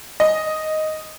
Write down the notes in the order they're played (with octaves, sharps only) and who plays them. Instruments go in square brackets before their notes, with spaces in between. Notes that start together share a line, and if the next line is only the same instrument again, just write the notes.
[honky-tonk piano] D#5